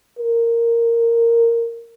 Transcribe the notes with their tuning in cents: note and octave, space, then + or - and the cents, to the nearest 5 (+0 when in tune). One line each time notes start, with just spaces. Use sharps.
A#4 -10